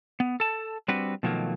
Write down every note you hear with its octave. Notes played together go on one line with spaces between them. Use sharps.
B3
A4 A5
G3 C4 D4 F#4 B4
B2 D#3 F3 F#3 A3 A#3